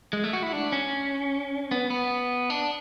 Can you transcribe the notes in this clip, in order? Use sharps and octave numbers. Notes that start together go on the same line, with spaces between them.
G#3
A3
F#4
E4
D4
C#4
B3
B3
D4